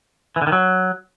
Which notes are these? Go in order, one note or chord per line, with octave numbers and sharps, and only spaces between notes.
E3
D3
D#3
F#3